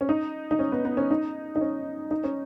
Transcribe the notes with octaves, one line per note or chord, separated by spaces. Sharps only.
C#4
D#4
D#4
C#4
B3
B3
C#4
D#4
D#4
C#4
D#4
C#4